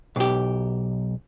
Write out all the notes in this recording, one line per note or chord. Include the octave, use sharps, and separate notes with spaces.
B1 G4